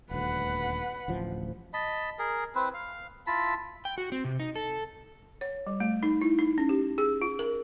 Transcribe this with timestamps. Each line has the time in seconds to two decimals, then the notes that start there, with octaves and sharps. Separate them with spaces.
0.11 D#1 D2 B4 F#5
1.08 D1 A1 F3
1.73 D#5 A5 B5
2.19 G#4 A#4
2.55 C4 E4 B4 C5
2.74 F5
3.27 E4 F4 A5 B5
3.85 G5
3.98 F#4
4.12 C4
4.24 C3
4.40 D#4
4.56 A4
5.41 C#5
5.67 G3
5.80 A3
6.03 D#4
6.22 E4
6.39 D#4
6.58 C#4
6.69 G4
6.98 G#4
7.22 F4
7.39 A#4